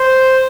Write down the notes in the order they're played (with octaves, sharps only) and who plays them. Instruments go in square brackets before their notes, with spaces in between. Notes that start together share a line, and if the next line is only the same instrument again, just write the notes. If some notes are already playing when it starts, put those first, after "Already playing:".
Already playing: [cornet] C5